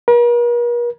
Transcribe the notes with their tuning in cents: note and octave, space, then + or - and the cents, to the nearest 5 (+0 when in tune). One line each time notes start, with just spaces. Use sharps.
A#4 +45